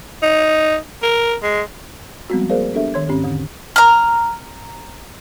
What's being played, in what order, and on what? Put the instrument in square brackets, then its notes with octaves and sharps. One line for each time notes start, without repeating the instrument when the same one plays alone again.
[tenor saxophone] D#4
A#4
G#3
[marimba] F3 G3 G#3 B3 C4 F#4
A#3 G#4 A#4 C5 D5 F5
B3 D4 G4 A4 E5
D#3 C#5 C6 G#6
G#2 C4 C#4 G4
E2 D3
[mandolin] A#5 F6